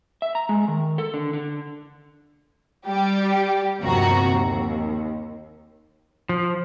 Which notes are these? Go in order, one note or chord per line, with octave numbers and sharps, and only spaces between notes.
E5
A#5
G#3
D#3
A4
D3
D3
G3 G4
G1 D#2 C3 F3 F#4 A#5
D#2
F3